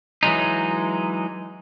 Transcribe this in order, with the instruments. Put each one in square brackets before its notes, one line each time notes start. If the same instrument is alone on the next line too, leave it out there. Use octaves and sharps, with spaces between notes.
[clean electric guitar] E3 F#3 G#3 D#4